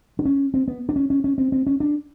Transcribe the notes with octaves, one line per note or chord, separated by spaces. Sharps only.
D4
C#4
C4
B3
D4
C#4
C#4
C#4
C4
C4
C#4
D4